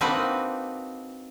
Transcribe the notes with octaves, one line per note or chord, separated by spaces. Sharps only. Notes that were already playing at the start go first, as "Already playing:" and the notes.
A#3 C4 D4 D#4 F#4 B4